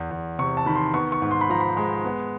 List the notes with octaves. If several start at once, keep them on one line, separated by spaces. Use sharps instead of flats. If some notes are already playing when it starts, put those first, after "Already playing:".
Already playing: E2
E2
C3 C#6
A5
D#3 B5
C6
B3 C#6
C#6
G#2
C6
B5
F3 A#5
B5
G#3
B3